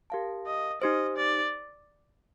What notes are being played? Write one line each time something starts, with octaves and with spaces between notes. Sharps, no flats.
G4 A#4 F5 A5
D#5
D#4 G4 C5 D#5
D5